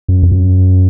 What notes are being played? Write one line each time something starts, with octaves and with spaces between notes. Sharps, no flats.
F#2
F2
F#2